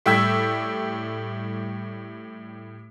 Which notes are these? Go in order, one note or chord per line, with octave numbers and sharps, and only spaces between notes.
A2 G3 G5 E6 G#6 B6